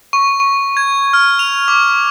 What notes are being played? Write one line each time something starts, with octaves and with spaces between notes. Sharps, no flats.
C#6
C#6
G#6
F6
F7
D6